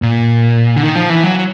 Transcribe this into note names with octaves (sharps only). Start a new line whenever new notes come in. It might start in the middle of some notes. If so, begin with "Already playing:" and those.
A#2
D3
D#3
F3
E3
F#3